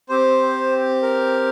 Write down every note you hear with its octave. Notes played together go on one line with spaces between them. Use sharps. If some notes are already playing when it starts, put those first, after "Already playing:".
C4 G4 C5
A#4